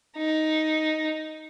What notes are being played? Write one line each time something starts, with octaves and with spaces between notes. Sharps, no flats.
D#4